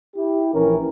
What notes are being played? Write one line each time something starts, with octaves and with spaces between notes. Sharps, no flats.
E4 G4
A#1 E3 C#4 A#4